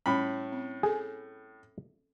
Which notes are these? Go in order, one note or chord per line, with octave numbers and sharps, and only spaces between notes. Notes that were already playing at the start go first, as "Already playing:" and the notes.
A2 G3 C#4 B5
C4
G#4 A4 G#5